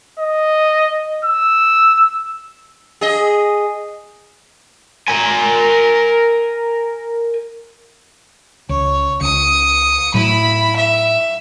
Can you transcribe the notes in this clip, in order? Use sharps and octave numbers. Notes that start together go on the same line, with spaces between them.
D#5
E6
G#4 D#5
A#4 G#5
C#2 C#5
C#2 D#6 C#7
A2 F#3 E4 B5
E5